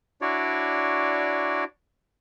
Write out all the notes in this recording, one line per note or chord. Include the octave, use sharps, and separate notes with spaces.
D4 E4 F#4 C#5 D5